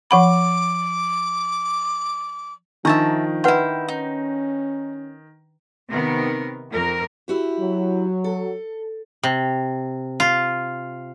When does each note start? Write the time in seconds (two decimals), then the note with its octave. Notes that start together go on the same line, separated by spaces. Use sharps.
0.11 F3 F#5 B5 D6
2.85 D#3 F3 D4 E5 A5 A#5 C6 C#6
3.44 E4 B4 F#5 G5 C6
3.88 C#4 D#4
5.90 C3 D#3 B3 A#4
6.71 F2 A#4
7.28 E4 F#4 G4
7.60 F#3
8.24 A4
9.23 C3
10.20 F4